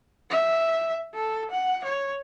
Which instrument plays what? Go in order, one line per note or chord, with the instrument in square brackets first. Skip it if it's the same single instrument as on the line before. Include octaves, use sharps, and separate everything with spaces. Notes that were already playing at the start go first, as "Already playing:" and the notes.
[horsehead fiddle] E5
A4
F#5
C#5